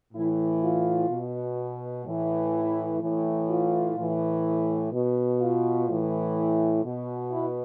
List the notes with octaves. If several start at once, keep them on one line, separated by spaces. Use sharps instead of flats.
A2 E3 E4
F4
B2
A2 E3
E4
A2 E3
F4
A2 E3
B2
F4
A2 E3
B2
E4